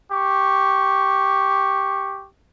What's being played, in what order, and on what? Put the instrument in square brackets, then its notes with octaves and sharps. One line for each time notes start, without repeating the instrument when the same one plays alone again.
[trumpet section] G4 C#6